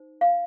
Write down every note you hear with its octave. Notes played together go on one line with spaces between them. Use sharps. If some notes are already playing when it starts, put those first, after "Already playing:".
Already playing: D#4 C5
F5